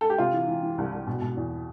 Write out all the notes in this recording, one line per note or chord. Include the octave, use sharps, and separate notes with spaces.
A4
G4
C3 F4
E3
E3
E3
C2
C2
B2
B2
E2